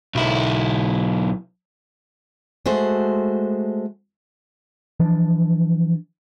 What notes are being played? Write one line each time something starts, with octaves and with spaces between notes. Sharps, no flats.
B1 E4
G#3 A3 F#4 C5
E3 F3 D4